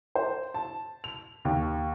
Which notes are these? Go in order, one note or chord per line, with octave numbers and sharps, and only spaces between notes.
C5
A5
F7
D#2